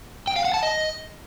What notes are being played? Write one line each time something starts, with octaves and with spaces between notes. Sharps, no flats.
G5
F5
F#5
A5
D#5